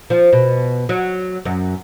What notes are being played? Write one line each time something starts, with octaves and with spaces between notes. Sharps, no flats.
F3
B2
F#3
F#2